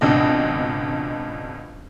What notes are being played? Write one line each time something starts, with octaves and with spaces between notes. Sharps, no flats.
G#1 C#2 B2 D4 D#5